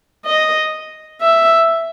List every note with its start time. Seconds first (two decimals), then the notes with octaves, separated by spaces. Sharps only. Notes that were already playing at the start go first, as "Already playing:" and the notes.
0.25 D#5
1.21 E5